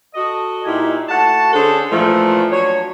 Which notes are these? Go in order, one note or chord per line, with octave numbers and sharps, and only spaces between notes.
F#4 A4 D#5
A#2 D#4 E4 G4 G#5
A3 F#4 F#5 A5
D3 C#4 G#4 A4 C5
A#2 E3 F3 A3
F#3 D4 C#5